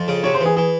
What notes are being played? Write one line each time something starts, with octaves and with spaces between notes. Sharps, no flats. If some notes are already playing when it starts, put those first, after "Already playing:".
Already playing: F2
C#3
C3 C#5
C5
E3 G#4
E3 G#4